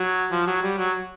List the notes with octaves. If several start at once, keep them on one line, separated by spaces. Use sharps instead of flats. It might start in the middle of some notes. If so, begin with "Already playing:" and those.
Already playing: F#3
F3
F#3
G3
F#3